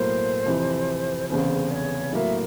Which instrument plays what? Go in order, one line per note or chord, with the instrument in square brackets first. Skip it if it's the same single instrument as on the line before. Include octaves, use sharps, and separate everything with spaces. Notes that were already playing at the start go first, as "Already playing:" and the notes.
Already playing: [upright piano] B1 A2 F#3 A#3 [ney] C5
[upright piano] F2 C3 E3
[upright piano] F1 E2 C#3 [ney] C5
[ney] D5
C#5
[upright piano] A2 F#3 A#3 [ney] E5